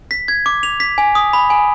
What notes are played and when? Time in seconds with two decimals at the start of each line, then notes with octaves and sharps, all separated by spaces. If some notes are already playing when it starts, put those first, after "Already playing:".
0.11 B6
0.28 G#6
0.46 D6
0.63 F7
0.80 B6
0.98 G#5
1.15 D#6
1.33 B5
1.50 G#5